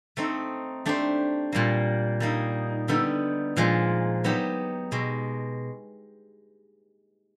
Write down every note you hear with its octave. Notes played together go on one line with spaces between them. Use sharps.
A3 C4 D#4
A3 D4 G4 C5
A#2 G3 A#3
G3 A#3 D#4
D3 G3 B3 D#4
A#2 F3 G#3
F#3 B3 D#4 G4
B2 G#3